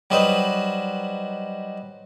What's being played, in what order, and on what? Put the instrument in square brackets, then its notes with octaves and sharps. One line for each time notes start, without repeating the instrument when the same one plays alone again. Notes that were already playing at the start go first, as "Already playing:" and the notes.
[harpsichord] F#3 G3 D#4 B4 C5 D#5